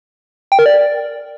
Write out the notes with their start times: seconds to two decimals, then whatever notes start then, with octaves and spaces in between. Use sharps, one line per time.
0.52 G5
0.59 A#4
0.66 D5